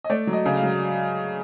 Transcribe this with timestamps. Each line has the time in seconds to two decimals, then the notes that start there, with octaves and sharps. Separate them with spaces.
0.04 D#5
0.10 A3 D5
0.27 F#3
0.33 D#5
0.46 C#3
0.57 F5
0.63 F#3